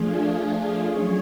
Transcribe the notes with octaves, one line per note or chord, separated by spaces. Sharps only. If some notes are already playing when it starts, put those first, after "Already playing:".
Already playing: F3 A3 D4 F4 G#4
F#3 C#4 G#4 C#5